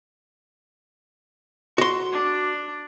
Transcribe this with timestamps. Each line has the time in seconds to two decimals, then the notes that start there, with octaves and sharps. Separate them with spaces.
1.78 F#4 C6
2.12 D4